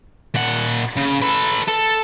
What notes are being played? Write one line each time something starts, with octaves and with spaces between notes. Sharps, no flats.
A#2 F#5
C#3
A4 B4
A4